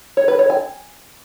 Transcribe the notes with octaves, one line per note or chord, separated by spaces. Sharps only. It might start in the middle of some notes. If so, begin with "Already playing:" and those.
C#5
B4
C#5
G#5